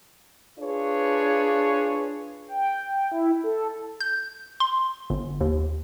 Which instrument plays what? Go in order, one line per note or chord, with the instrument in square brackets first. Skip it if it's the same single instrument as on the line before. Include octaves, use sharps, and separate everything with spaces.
[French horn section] D4 F4 G#4 B4 C#5
[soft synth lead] G5
E4
A4
[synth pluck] G6
C6
G1
D#2